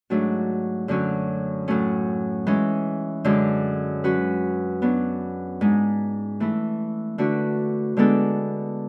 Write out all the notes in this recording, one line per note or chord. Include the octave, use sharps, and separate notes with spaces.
G#2 F#3 A3 D4 F#4
F#2 D3 F#3 C#4 F#4
A2 F#3 A3 C#4
E3 G#3 C#4
F#2 D3 G#3 D4
F#3 C#4 F#4 B4
F#3 B3 D4
G#2 G#3 D4
E3 A3 E4
D3 A3 D4 F#4 B4
D3 G#3 B3 D4 A4